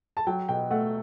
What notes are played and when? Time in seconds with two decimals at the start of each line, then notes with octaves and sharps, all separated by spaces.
0.17 A5
0.27 F#3 G5
0.49 B2 G5
0.71 A3 F#5